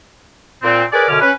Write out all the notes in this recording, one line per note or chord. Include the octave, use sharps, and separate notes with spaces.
A#2 C4
G#4 A#4 B4 C#5 D5
F#2 B2 D3 C#4 D6 F6
C#4 B4